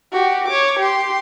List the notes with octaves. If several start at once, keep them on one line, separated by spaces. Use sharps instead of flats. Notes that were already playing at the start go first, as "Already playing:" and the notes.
F#4 G4
C#5 D6
G4 C6